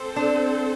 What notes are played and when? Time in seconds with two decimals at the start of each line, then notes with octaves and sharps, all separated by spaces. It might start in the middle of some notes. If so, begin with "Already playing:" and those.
Already playing: C4 A4 C5
0.16 D4